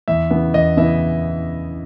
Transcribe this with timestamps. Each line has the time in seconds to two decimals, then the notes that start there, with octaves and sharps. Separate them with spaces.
0.08 E2 E5
0.31 C#3 E3 B3 E4
0.54 E2 D#5
0.77 C#3 E3 B3 E4 E5